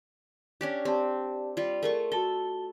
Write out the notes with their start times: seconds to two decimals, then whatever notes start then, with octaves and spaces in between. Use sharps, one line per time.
0.61 C#4 D4 G4
0.85 C4 G4 D5 A5
1.57 G3 F4
1.83 A3 F4 G#4 A#4 C#6
2.12 F#4 A4 A5 G7